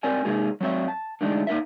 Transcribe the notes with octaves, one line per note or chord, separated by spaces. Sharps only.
C4 A#4 C5 D5 G#5
C3 G#3 A#3 D#4 G#4
F#3 C4 E5
A5
D3 E3 G#3 A3 D4 D#4
A#3 D#4 A#4 E5